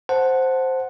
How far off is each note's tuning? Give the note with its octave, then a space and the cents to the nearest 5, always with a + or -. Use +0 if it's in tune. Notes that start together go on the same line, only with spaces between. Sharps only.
C5 +0 F#5 +0 A5 +0